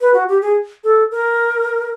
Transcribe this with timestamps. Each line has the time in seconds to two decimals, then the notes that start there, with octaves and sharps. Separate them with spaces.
0.01 B4
0.14 F#4
0.28 G4
0.42 G#4
0.84 A4
1.11 A#4